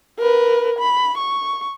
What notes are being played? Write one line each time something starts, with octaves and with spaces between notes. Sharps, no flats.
A#4 B4
B5
C#6